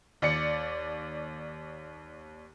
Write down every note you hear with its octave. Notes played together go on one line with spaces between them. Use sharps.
D#2 D5 C#7